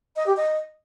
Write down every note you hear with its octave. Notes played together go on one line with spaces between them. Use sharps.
D#5
G4
D#5